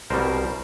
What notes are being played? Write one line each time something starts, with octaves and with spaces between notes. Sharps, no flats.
C2 B2 G3 A#4 C5